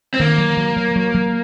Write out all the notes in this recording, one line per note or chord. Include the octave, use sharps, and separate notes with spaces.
C4
D#3 A#3
F#3
F#3
F#3
F#3
F#3